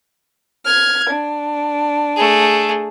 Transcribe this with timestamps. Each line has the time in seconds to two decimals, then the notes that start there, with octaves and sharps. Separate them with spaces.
0.64 F6 G#6
1.09 D4
2.16 A3 G#4